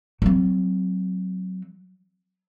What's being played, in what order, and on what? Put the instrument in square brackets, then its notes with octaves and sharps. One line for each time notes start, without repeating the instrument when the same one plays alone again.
[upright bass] F#3 C4